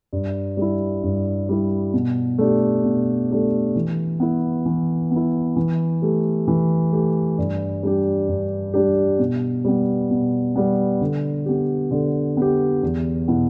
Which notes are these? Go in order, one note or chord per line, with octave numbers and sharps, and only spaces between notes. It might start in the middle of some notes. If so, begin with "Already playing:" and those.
G2
G3 E4
G2
G3 E4
B2
A3 D4 G4
B2
A3 D4 G4
E3
B3 E4
E3
B3 E4
E3
A3 G4
E3
A3 G4
G2
G3 D4 G4
G2
G3 D4 G4
B2
G3 B3
B2
G3 B3
D3
B3 G4
D3
B3 G4
E2
B2 B3 E4